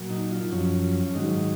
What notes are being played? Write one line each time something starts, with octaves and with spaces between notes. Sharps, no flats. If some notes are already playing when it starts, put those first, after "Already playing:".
Already playing: A#2 F#3
D#4
F4
F#2 F3 C#4
G#2 D#3 F#3 D#4